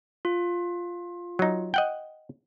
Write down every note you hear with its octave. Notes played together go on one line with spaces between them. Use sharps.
F4
F#3 D#4
D#5 F#5 G5